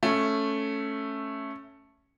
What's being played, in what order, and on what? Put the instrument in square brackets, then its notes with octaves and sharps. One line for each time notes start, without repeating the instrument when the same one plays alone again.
[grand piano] A3 C#4